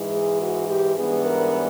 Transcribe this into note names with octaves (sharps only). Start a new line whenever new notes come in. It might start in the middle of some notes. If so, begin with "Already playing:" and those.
Already playing: G#2 E3 G#3
G#4
F#4
G4
G#2 E3 G3 B3 D4 G#4
A#4